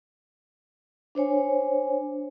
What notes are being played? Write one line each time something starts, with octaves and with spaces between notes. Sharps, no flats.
D4 C5 C#5 G#5